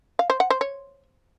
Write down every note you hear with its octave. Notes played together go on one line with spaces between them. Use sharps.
F5
C5
F#5
C5
C#5